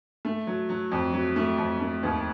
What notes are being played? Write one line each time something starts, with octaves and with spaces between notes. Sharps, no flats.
A3
F#3
F#3
F2
F#3
A3
F2
A3
D#2